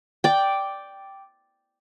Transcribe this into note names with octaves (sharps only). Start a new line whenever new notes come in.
D5 G5